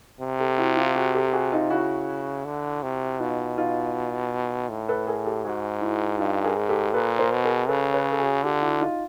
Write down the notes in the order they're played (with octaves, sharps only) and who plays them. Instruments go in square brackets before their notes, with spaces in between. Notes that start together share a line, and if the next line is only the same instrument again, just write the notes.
[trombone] C3
[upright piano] G4 A4
E4 F#4
F4 G4
F#4 G#4
G4 A4
F#4 G#4
D#4 F4
[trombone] C#3 [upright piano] E4 F#4
[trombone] D3
C3
[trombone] B2 [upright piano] D#4 F4
[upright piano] D#4 F4
[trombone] A2
[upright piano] A4 B4
G#4 A#4
G4 A4
[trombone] G#2 [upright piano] F#4 G#4
[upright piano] E4 F#4
[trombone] G2 [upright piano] D#4 F4
[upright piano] G#4 A#4
[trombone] G#2
[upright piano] G4 A4
[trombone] A#2 [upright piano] A4 B4
[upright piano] A#4 C5
[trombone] B2
[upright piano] G#4 A#4
[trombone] C#3 [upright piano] A4 B4
[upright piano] B4 C#5
A4
F#4 G#4
[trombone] D3 [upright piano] F4 G4
[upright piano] E4 F#4
D#4 F4